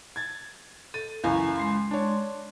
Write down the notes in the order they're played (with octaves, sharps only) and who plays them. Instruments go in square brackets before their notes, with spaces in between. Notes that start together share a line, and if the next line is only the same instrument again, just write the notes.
[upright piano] G#6 A6
[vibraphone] A4 [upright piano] A6 D#7
[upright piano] C#2 F#2 E3 [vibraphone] F5 A#5 C#6
[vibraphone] G#3 C6
[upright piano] D4 C#5